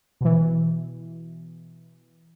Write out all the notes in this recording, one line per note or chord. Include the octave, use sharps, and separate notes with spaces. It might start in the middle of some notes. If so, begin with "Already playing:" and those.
B2 E3